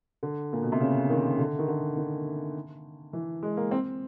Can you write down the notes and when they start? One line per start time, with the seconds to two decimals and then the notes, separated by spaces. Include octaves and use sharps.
0.23 D3
0.53 A#2
0.62 B2
0.72 C3
0.80 C#3
1.10 D#3
1.39 D3
1.59 D#3
1.68 D3
1.97 D#3
3.13 E3
3.43 G#3
3.57 A#3
3.71 C4